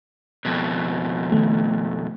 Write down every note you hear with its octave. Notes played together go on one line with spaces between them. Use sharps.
F2 B2
D#3 A3